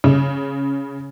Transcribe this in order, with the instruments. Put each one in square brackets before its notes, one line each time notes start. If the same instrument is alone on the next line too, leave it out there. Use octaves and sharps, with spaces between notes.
[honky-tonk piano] C#3